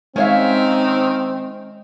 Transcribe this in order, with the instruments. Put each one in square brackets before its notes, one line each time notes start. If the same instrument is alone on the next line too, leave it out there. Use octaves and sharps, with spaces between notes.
[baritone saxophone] D#3 [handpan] G#3 E5 [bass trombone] C4 [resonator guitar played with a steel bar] C#4 C#5 F5